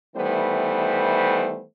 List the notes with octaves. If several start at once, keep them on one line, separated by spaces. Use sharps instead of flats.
D#3 E3 G3 A3 B3 C5